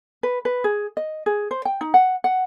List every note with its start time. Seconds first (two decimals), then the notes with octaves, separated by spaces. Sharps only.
0.23 B4
0.45 B4
0.64 G#4
0.97 D#5
1.26 G#4
1.51 C5
1.65 G5
1.81 D#4
1.94 F#5
2.24 F#5